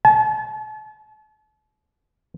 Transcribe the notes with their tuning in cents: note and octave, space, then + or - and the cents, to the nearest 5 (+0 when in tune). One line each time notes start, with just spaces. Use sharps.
A5 -40